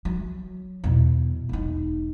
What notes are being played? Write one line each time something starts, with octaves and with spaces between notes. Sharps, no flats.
F#3
E2 B2
E1 D#4